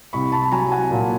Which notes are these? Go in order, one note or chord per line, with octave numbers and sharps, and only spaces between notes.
C2 B5 C#6
A5 B5
F#3 G#5 A#5
F#5 G#5
A#2